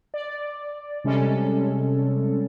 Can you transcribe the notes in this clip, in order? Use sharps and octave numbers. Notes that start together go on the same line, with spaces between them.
D5
C3 G3 G#3 C#4 A4